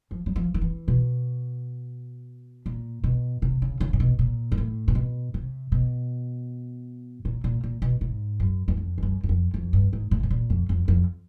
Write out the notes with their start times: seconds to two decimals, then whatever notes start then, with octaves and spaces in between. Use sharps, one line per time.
0.11 F3
0.26 F#3
0.36 F3
0.54 D#3
0.61 E3
0.88 B2
2.66 A#2
3.04 B2
3.42 C3
3.62 C#3
3.80 C#3
3.93 A#2
4.00 B2
4.19 A#2
4.52 G#2
4.57 A2
4.88 A#2
4.95 B2
5.34 C3
5.72 B2
7.25 A#2
7.44 A#2
7.63 A#2
7.82 B2
8.01 G#2
8.40 F#2
8.68 E2
8.77 F2
8.98 G2
9.03 F#2
9.23 F#2
9.29 F2
9.54 F2
9.73 G2
9.93 G#2
10.11 A2
10.23 A2
10.30 A#2
10.50 F2
10.69 F2
10.88 F2